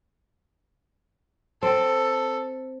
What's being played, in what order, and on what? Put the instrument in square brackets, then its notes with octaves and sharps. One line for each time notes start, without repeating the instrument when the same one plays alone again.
[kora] C4 [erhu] A4